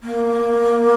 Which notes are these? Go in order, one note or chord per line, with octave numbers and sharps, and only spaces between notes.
A#3